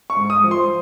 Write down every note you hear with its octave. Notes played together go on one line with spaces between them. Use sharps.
C#6
G#2
D#6
F3
C6